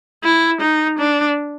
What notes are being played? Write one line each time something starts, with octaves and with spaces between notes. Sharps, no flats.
E4
D#4
D4